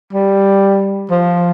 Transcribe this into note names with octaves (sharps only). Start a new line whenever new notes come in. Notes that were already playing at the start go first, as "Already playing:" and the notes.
G3
F3